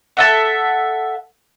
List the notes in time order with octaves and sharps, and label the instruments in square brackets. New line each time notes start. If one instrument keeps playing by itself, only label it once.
[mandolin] A4 E5 F#5